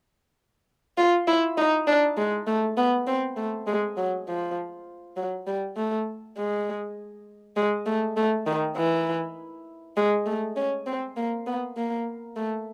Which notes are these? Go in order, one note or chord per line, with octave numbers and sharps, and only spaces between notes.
F4
E4
D#4
D4
G#3
A3
B3
C4
A3
G#3
F#3
F3
F#3
G3
A3
G#3
G#3
A3
A3
D#3
E3
G#3
A3
C#4
C4
A#3
B3
A#3
A3